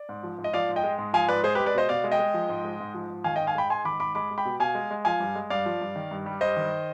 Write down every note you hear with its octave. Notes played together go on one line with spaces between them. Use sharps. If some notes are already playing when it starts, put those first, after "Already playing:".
Already playing: D5
G#2
F3
G#2
D#5
F3 D5 F5
G#2
D#5 G5
G#3
G#2
F3 F5 G#5
G#2 B4 D5
G#3 G#4 C5
G4 B4
G#3
B4 D5
B2 C5 D#5
B2 D5 F5
G#3
D#5 G5
G#3
F3
G#2
G#3
G#2
F3
G#2
D#3 F5 G#5
D#5 G5
G#2
F5 G#5
G#3 G5 B5
G#2 G#5 C6
D#3 B5 D6
G#2 B5 D6
G#3 B5 D6
G#3
G5 B5
B2
B2 F5 G#5
G#3
G#3
F3 F5 G#5
G2
G#3
G2 D5 F5
F3
G2
D#3
G2
G3
G2 C5 D#5
D#3